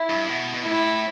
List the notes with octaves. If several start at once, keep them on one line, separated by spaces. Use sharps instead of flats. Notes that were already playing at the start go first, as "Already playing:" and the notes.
Already playing: E4
G2
B2
B2
A2 E4